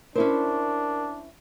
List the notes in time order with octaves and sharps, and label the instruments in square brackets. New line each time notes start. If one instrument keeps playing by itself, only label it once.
[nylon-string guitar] C#4 E4 C5 [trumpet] D4 [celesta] A#4